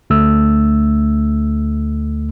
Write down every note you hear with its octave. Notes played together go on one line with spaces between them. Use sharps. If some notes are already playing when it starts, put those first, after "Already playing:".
D2 A3 E6